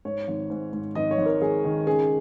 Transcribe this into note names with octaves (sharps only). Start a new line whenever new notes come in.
G#2 C#5
G#1
G#2
G#2
G#1 D#5
C#5
G#1
A#4
G#1 G#4
D#3
C#3 G#4